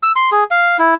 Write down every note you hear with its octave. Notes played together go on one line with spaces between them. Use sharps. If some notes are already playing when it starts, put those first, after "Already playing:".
E6
C6
G#4
F5
E4